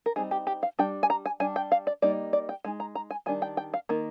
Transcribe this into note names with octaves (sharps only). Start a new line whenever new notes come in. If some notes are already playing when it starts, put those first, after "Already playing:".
A#4
G3 C4 D#4 G#4
G4
G4
F5
G3 D4 G5
G#5
A#5
G#5
G3 D4 G#5
G5
F5
D5
G3 A#3 D#4 D5
D5
G5
G#3 D#4 G#5
A#5
A#5
G#5
D#3 G3 D4 G#5
G5
G5
F5
D#3 A#3